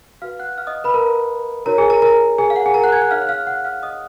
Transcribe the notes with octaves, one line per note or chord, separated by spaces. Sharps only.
F#4 B4 F5 F6
F#5 F#6
F5 F6
D#5 D#6
B4 B5
A#4 A#5
D#4 F#4 A#4 C#5 A#5
G#4 G#5
A#4 A#5
A#4 A#5
G#4 G#5
F5
F#5
G#4 G#5
A#4 A#5
F#5 F#6
G#5 G#6
F#5 F#6
D#4 G#4 C#5 F5 F6
F#6
F5 F6
F#5 F#6
F5 F6
D#5 D#6